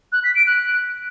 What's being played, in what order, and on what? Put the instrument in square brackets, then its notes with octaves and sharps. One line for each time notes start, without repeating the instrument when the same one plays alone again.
[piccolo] F#6
B6
D7
F#6